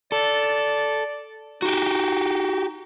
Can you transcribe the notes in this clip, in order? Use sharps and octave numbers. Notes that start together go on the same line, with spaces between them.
A4 D5
D#4 F#4 G4